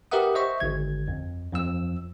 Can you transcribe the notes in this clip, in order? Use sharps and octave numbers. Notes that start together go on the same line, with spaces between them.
G4 A#4 B4 E5 F#5 D#6
C5 D#5 E5 C#6
G#1 D3 G#6
F2
F2 F3 E6